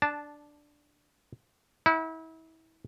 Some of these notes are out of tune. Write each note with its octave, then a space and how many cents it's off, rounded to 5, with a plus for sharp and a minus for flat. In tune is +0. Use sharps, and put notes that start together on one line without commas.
D4 +0 A5 -10
E4 -35 F#5 +0